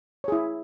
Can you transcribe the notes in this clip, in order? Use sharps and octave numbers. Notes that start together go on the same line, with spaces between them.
E4 G#4 C#5